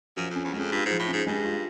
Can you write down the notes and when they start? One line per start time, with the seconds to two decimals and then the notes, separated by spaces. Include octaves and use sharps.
0.17 F#2 F3
0.30 F2
0.36 C#4
0.45 E2
0.53 F#2 G#3
0.59 F2
0.72 G2 F4
0.86 G#2
0.91 F3
0.99 A2
1.08 G#2 C#4
1.27 G2 G#3
1.45 F4